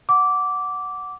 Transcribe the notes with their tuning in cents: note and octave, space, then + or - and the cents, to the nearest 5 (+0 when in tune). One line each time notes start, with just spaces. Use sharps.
F#5 +0 D6 -10